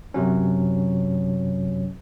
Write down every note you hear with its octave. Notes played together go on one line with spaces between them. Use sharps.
F#2 C3 F#3 C#4